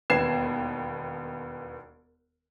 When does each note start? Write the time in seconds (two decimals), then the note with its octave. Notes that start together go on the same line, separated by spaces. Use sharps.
0.10 E1 D#2 B3 G#6 C7 E7